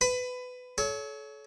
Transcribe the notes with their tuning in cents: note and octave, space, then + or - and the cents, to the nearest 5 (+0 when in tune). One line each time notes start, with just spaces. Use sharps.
B4 +20 B5 +25
A4 -35 C#5 +20